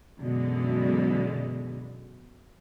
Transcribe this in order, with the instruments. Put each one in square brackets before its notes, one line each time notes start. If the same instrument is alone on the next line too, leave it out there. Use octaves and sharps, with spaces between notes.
[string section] F#2 B2 D3 E3 F#3 G#3